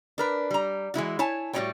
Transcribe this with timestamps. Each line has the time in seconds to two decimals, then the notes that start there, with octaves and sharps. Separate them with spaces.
0.18 D4 A#4 B4
0.51 G3 A#5
0.94 E3 G#3 E4 F#4
1.19 E4 C#5 G#5 A5
1.53 A2 G3 A#3 F#4 C#5 G5